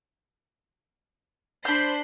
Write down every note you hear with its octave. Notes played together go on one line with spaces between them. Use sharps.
D4 C5 B5 C6 G6